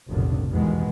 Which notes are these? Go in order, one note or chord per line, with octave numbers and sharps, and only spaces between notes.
F1 B1 A2 D3 D#3
E2 G2 B2 D#3 G#3 B3